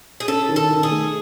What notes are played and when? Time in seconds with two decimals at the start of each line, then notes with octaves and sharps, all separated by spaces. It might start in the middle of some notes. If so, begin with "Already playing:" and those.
0.20 G#4
0.28 C#4 A4
0.49 D#3
0.56 A4
0.70 D#3
0.83 G#4
0.91 A3